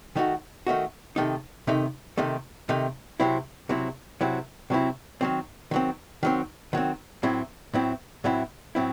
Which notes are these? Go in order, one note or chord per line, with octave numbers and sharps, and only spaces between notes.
D#3 A3 D#4 F#4
D#3 A3 D#4 F#4
C3 D#3 A3 D#4
C3 D#3 A3 D#4
C3 D#3 A3 D#4
C3 D#3 A3 D#4
C3 F#3 C4 E4
C3 F#3 C4 E4
C3 F#3 C4 E4
C3 F#3 C4 E4
D#3 F#3 C4
D#3 F#3 C4
D#3 F#3 C4
D#3 F#3 C4
A2 F#3 C4 E4
A2 F#3 C4 E4
A2 F#3 C4 E4
A2 F#3 C4 E4